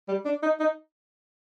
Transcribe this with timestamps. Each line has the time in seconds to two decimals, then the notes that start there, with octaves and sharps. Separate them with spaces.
0.08 G3
0.25 D4
0.43 D#4
0.60 D#4